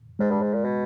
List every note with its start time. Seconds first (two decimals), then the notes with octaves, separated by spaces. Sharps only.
0.19 G#2 G#3
0.31 G2
0.42 G#2
0.53 A#2
0.65 B2